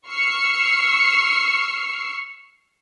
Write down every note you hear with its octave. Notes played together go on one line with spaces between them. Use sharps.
C#6 E6 F6 C7 C#7